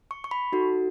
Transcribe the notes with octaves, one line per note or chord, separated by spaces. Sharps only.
C#6
C#6
B5
D#4 F#4 A4